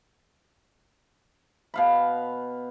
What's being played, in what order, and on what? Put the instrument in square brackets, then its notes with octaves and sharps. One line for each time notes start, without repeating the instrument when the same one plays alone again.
[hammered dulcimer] B2 F5 B5